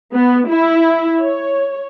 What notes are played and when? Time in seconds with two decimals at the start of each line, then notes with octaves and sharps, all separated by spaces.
0.13 B3
0.48 E4
1.21 C#5